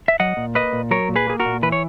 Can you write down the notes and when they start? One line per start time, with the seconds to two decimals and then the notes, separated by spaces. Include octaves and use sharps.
0.08 E5
0.20 F#3 D#5 F#5
0.37 A#2
0.55 A#3 B4 D#5
0.73 A#2
0.91 F#3 A#4 C#5
1.09 A#2
1.16 G#4 B4
1.27 A#3 G#4
1.40 F#4 A#4
1.46 A#2
1.62 E3 B4
1.72 C#5